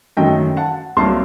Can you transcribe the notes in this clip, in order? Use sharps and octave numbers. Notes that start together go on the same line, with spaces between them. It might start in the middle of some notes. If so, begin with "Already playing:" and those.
F#2 D#3 F#3 A3 D#5 G5
F#5 A5
C2 C3 F#3 A#3 A5 C6